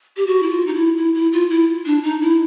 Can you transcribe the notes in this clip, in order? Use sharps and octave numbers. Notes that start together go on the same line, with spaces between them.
G4
F#4
E4
F4
D#4
E4
E4
E4
F4
E4
D4
D#4
E4